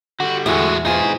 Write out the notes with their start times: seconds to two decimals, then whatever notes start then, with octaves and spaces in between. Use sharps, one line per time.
0.20 D3 G3 F#4
0.46 E2 A2 G#3 F#4
0.85 G#2 B2 D#4 F4 G#4